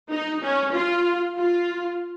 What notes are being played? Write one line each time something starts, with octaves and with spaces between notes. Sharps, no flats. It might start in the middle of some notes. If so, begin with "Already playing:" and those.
D#4
C#4
F4
F4